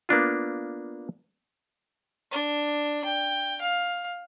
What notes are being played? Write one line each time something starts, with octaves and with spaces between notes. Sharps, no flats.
A#3 B3 D4 F4
D4
G5
F5